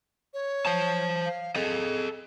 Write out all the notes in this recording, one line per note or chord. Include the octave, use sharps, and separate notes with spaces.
C#5
C5 A5
F5
G#4 A4 D#5